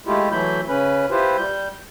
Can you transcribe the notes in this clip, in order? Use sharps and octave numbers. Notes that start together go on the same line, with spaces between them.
G#3 A3 E4 F4 G4
E3 F#3 A3 E4 B5 G6
C#3 C#4 B4 B5
E4 F4 G4 B4 C5
G3 G6